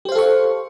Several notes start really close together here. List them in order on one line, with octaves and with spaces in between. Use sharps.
G4 C5 F5 A4 C#6